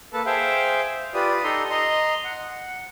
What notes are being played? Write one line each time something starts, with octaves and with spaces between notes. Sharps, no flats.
A#3 A4 B4 A5
G#4 C5 E5 F5 G5
F4 G4 B4 D5 D#6
D#4 A4 A#5 C6 D#6
D#5 A#5 C6
F#5